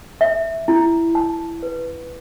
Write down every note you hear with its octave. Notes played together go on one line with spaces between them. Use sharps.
E5
E4
A5
B4